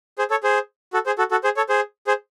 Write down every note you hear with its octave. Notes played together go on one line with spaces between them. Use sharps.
G#4 C5
A4 C#5
G#4 C5
F#4 A4
G#4 C5
F#4 A4
F#4 A4
G#4 C5
A4 C#5
G#4 C5
G#4 C5